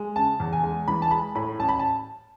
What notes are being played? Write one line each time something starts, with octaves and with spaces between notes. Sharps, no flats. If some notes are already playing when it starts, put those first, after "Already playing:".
Already playing: G#3
C#3 A5
E2
G#5
G#3
E3 B5
A5
G#3 B5
A2 B5
A1 A5
B5
A5